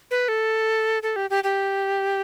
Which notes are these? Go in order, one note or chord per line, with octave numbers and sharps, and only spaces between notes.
B4
A4
A4
G4
G4
G4